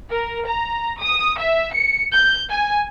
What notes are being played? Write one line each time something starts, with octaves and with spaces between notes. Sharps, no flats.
A#4
A#5
D#6
E5
C#7
G6
G#5